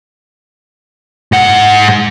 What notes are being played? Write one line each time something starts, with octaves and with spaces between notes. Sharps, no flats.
G#2 F#5